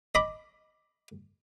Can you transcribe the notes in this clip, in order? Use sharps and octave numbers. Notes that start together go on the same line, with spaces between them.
D#5 B5 D6